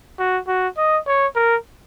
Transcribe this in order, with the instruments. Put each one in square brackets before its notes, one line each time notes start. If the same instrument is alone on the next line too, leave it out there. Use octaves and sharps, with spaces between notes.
[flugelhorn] F#4
F#4
D#5
C#5
A#4